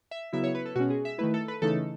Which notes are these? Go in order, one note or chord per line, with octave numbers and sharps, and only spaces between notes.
E5
C#3 F#3 B3 E4 E5
C#5
B4
A4
B2 G#3 C#4 F#4
G#4
E5
D#3 A3 E4 B4
A4
B4
C#3 E3 A3 D#4 A4